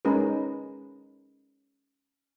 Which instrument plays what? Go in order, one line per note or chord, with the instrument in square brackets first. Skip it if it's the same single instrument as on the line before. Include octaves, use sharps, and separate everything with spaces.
[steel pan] G#3 C#4 D#4 G#4 A#4 B4